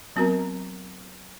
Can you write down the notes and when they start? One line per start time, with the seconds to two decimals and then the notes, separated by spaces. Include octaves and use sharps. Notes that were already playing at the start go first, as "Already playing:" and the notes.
0.16 F#3 B3 C4 F#4 A#4 A#5